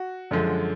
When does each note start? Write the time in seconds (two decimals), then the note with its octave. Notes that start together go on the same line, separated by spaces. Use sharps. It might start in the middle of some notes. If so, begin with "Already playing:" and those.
Already playing: F#4
0.31 F#2 D3 F3 G#3